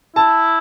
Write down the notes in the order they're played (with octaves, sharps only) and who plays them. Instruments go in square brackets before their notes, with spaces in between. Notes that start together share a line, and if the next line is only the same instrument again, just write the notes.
[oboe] E4 [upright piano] A5